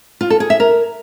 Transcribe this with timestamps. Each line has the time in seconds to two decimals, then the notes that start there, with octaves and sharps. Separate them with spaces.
0.21 F4
0.30 A4
0.40 G#4
0.50 E5
0.60 A#4